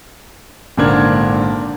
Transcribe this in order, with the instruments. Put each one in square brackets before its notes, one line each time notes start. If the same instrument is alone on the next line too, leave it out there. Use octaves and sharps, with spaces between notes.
[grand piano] G#1 A#2 D3 D4 A#4 G#6